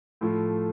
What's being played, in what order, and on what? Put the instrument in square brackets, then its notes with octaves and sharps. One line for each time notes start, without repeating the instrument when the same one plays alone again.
[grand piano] A2 F3 A3